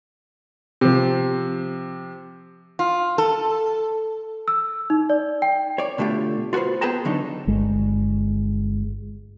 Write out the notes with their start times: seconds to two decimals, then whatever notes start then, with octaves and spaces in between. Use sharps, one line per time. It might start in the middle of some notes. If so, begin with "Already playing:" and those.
0.81 C3 F3
2.79 F4
3.18 A4
4.48 E6
4.90 D#4
5.10 D5
5.42 G5
5.78 C#5 D5
5.98 B2 D3 A3 F4 G4
6.53 F4 F#4 G#4 B4 C5
6.81 B3 G#4 B4 G5 A5 A#5
7.05 D3 F#3 D4 D#4 C#5
7.47 G1 G#3